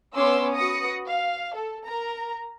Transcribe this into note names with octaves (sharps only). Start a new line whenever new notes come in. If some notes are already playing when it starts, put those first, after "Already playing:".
B3 C#4 C6 D6 E6
F#4 B4 D#6 A#6 C#7
F5
A4
A#4 A#5